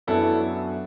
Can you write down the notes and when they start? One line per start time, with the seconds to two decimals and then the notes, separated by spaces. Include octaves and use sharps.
0.07 F#2 F#3 B3 D4 E4 A4